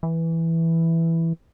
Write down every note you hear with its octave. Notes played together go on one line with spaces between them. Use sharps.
E3